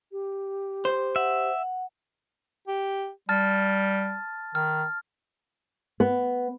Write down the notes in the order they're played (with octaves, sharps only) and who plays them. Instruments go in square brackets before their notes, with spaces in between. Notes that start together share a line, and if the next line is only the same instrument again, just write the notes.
[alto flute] G4
[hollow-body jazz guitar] C5
[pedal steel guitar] E5 [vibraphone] F#5
[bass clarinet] G4
[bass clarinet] G3 [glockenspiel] A5 F6 A6
[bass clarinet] D#3 [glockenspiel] F6
[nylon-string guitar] B3